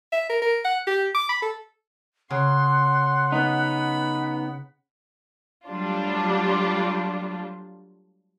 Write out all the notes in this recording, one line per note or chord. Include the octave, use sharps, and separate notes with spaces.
E5
A#4
A#4
F#5
G4
D6
B5
A4
C#3 F#5 C6
B3 D#4 B5
F#3 G3 A3 D4 F4